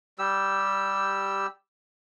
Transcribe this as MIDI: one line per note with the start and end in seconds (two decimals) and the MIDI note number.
0.19 1.47 55
0.19 1.47 67
0.19 1.47 88